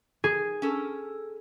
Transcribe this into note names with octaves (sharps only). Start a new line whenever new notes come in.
G#4
C#4 A4 A#4